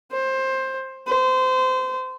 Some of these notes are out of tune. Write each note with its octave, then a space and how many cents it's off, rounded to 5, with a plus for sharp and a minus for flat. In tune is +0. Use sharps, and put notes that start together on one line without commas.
C5 +15
C5 -25